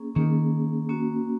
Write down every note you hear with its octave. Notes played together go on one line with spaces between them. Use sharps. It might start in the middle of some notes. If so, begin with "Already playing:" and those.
Already playing: A#3 C#4 G#4
D#3 A#3 C#4 G#4
A#3 C#4 F#4